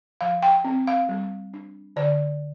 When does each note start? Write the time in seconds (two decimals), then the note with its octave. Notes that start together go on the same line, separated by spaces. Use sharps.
0.21 F3 F5
0.43 G5
0.64 C4
0.87 F5
1.09 G3
1.53 D4
1.96 D3 D5